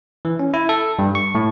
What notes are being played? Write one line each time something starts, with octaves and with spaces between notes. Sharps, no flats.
E3
C#4
E4
A4
G2
C#6
A2